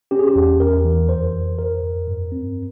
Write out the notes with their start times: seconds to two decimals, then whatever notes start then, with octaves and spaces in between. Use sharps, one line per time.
0.11 C#4 G4
0.19 G#4
0.27 G4
0.36 E2
0.60 E2 A#4
0.85 E3
1.09 F2 C5
1.34 F2
1.58 F2 A#4
1.83 F2
2.08 G2
2.32 C4